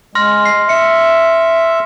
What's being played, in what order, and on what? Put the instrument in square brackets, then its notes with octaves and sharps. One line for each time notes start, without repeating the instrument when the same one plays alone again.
[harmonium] G#3 [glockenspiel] C6 F6 A#6
[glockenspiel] C7
[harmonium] E5 [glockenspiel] C#7